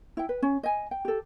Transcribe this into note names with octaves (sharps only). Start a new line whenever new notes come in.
E4 G5
B4
C#4
D#5 G#5
G5
G4 A4